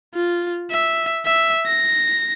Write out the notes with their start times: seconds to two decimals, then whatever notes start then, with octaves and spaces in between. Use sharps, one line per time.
0.15 F4
0.71 E5
1.26 E5
1.67 A#6